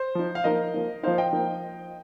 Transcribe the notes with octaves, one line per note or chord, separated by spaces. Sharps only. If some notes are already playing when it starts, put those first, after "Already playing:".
Already playing: C5
F3 D#4
F5
F3 A#3 D#4 A#4 D#5
F3 A#3 D#4
F3 A#3 D#4 C5 F5
D#5 G5
F3 A#3 D#4